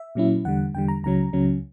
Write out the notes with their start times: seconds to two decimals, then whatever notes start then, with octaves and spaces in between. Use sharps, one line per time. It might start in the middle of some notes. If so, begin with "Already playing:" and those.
Already playing: E5
0.15 A#2 F#3 C#4 E4
0.45 E2 D3 G3 F#5
0.74 E2 D3 G3 G5
0.88 A#5
1.04 C#2 C#3 F#3 C#4 A#5
1.33 C#2 C#3 F#3 C#4